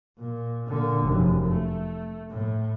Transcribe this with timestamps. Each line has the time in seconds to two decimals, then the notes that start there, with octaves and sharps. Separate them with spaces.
0.19 A#2
0.66 A#2 D3
1.03 F1 F#2
1.45 A3
2.30 A2